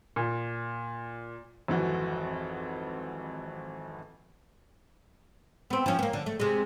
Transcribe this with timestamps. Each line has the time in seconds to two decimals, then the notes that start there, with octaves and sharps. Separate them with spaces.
0.16 A#2
1.68 G#1 F2 E3 F#4
5.70 B3 C4
5.86 F3 C#4
5.99 A#3 B3
6.13 D3
6.26 A3
6.40 C3 G#3